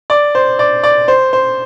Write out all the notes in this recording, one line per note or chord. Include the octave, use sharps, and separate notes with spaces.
D5
C5
D5
D5
C5
C5